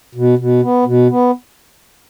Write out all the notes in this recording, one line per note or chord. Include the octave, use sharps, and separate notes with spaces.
B2
B2
B3
B2
B3